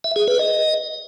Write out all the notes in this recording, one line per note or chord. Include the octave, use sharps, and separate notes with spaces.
E5
G#4
B4
D#5